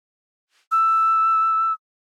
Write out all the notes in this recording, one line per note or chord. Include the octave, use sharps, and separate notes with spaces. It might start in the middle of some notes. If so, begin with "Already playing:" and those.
E6